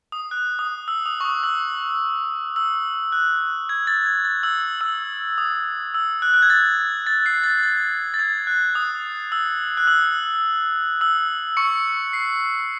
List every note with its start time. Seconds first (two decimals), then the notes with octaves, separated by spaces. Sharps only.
0.12 D#6
0.31 F#6
0.59 D#6
0.88 E6
1.06 D#6
1.20 C#6
1.25 D#6
1.43 E6
2.56 E6
3.12 F#6
3.69 G#6
3.87 A6
4.06 G#6
4.25 A6
4.43 E6
4.81 E6
5.38 D#6
5.94 E6
6.22 F#6
6.34 F#6
6.42 G#6
6.50 A6
7.07 A6
7.26 C7
7.44 A6
7.63 A6
8.14 A6
8.19 G#6
8.47 F#6
8.75 D#6
9.32 E6
9.77 F#6
9.87 E6
11.01 E6
11.57 C#6 C#7
12.13 C7